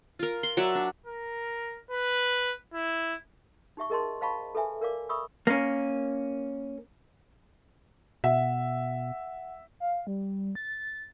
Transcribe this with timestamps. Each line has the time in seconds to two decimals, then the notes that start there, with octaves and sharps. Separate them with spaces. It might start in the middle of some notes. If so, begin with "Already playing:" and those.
0.19 F4 A#4
0.43 C6
0.57 F#3 F#4 D5 E5
0.75 D4
1.06 A#4
1.91 B4
2.74 E4
3.77 D#4 G4 E5 C#6
3.90 G#4 A#4 D#5 A5 C6
4.21 C5 D#5 F5 A5 B5 C#6
4.55 A4 B4 E5 G#5
4.81 A#4 D5 F5 D6
5.09 E5 B5 C#6 D#6 E6
5.47 A#3 C#4
8.24 B2 E5 F#5
9.80 F5
10.07 G3
10.55 A6